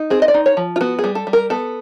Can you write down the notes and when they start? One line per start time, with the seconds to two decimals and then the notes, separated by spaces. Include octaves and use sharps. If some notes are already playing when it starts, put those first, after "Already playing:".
Already playing: D#4
0.10 C4 G#4
0.22 D#5
0.28 D5
0.34 D#4
0.46 C#5
0.57 F3
0.76 F4
0.81 B3 F#4
0.99 G#4
1.04 G3
1.15 A4
1.27 G3
1.33 A#4
1.50 B3 A4